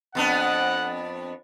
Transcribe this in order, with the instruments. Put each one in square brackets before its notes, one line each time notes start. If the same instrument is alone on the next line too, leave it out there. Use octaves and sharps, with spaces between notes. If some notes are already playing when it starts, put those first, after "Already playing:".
[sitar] F2 B3 D4 [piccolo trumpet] F#5